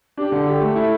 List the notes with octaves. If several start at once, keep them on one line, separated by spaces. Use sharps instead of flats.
D4 G4
D3
G4 A4
A3
E4